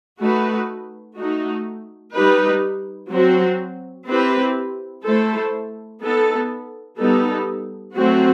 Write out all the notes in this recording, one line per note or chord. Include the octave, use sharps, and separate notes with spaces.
A3 D#4 F#4 B4
A3 D#4 F#4
G3 D#4 G4 B4
F#3 C4 F#4
C4 E4 G4 B4
A3 E4 A4 C5
B3 D#4 A4
G3 B3 D#4 A4
F#3 A3 C4 F#4